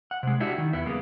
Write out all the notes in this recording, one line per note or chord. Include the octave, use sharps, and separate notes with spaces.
F#5
C3 G#3
D4 E4 F#4 G4 E5
D#3
E2 B3 E4
C#3 G3 G#3 A#3 B3